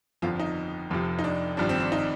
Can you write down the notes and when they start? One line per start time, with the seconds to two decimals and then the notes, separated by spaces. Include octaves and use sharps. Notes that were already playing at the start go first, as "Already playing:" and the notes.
0.22 G1 F2 D3 F3 F4
0.39 D#4
0.90 F1 F2 C3 F3
1.19 D#4
1.24 D4
1.57 G#1 G2 F3 D4
1.69 C4
1.80 D4
1.92 D#4